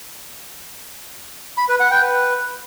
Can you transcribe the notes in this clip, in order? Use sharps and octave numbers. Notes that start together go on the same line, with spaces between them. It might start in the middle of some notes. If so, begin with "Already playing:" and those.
B5
B4
F#5
G5
B4